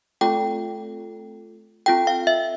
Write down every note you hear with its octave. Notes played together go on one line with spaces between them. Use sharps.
A3 C4 F4 A4 G5
C4 F4 A4 G5
F5
E5